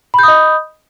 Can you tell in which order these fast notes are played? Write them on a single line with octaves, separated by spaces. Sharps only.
B5 G6 D#6 D#5